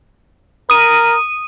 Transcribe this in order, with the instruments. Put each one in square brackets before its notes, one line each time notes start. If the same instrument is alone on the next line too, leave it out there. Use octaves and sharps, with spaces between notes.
[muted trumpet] A#4 [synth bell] D#6 D#7